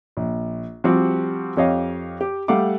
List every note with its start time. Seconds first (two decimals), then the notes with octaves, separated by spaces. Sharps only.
0.17 A#1
0.84 F3 G3 C4 F#4 G4
1.57 F2 G4 C#5 D#5 F5 G5
2.21 G4
2.48 G3 A3 F5 F#5 D6